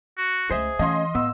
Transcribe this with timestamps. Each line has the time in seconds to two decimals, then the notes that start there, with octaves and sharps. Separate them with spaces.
0.17 F#4
0.51 C#2 A3 G#4 C5 D#5 E5
0.79 E3 A3 C#4 D#5 F5 C6
1.15 A2 B3 E6